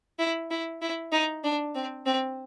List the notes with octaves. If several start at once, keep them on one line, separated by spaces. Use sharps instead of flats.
E4
E4
E4
D#4
D4
C4
C4